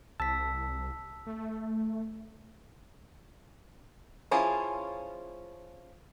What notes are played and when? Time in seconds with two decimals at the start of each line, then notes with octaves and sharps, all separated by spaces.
0.20 C2 A5 E6 B6
1.26 A3
4.31 F3 C#4 E4 F4 G#4